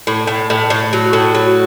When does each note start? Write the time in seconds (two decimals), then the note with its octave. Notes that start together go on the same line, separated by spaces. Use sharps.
0.07 A2
0.27 A2
0.50 A2
0.70 A2
0.93 F#3
1.13 A2
1.35 F#3